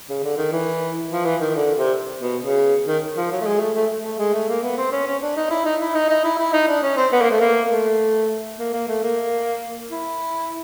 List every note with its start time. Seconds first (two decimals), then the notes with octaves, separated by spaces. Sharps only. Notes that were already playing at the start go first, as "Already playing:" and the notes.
0.09 C#3
0.23 D3
0.37 D#3
0.52 E3
1.12 F3
1.25 E3
1.41 D#3
1.55 D3
1.77 C3
2.22 B2
2.44 C#3
2.87 D#3
3.17 F3
3.32 F#3
3.41 A3
3.46 G#3
3.60 A3
3.75 A3
4.05 A3
4.19 G#3
4.34 A3
4.49 A#3
4.63 B3
4.78 C4
4.92 C#4
5.06 C#4
5.22 D4
5.37 D#4
5.50 E4
5.65 D#4
5.81 E4
5.95 D#4
6.10 D#4
6.24 E4
6.38 E4
6.53 D#4
6.68 D4
6.83 C#4
6.97 C4
7.12 B3
7.22 A#3
7.31 A3
7.40 A#3
7.71 A3
8.59 A#3
8.73 A#3
8.88 A3
9.03 A#3
9.91 E4